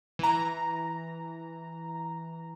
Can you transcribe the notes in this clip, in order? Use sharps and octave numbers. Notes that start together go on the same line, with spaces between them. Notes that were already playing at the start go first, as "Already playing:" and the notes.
E3 A#5